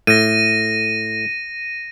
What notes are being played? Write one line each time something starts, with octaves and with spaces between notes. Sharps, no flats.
A2 A#6 D#7